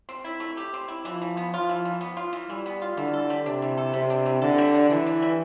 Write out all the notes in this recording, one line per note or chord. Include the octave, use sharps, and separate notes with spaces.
C4
E4
A3
G4
C4
E4
E3 F3
E3
B3
F3 F4
E3
E3
B3
F4
E3
E3 G3
B3
F4
D3 E3
A4
G3
C3 D4
E3
A4
C3 G3
D4
E3
D3 A4
G3
D4
D3 E3
D3
G3